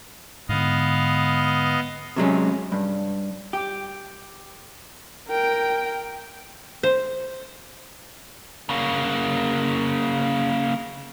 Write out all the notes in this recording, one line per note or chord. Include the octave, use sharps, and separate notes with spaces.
G#2 D3 B3 D#5 F5
C3 F#3 G#3 C#4
G2
G4
A#4 G5
C5
C#3 A#3